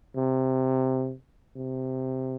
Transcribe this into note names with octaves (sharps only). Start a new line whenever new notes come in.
C3
C3